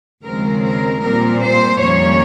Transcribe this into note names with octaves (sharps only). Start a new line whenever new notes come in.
D#2 C#3 F3 G#3 C4 A#4
A#4
A#2 G3 C4 A#4
C5
F2 D#3 G3 A#3 C#4 C#5